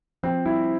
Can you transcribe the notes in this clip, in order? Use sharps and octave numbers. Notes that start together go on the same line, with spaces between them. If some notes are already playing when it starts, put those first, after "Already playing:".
F3 C4
G3 E4